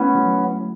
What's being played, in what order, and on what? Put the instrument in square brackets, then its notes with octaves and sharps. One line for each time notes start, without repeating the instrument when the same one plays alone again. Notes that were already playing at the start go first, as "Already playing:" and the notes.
Already playing: [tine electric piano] A3 E4 [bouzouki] B3 C#4
[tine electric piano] F#3